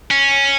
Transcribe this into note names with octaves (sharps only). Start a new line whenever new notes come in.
C#4